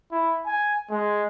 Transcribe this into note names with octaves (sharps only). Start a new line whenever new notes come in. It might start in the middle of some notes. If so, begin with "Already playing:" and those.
E4
G#5
G#3